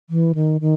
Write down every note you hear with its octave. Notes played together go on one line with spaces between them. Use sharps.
E3
D#3
D#3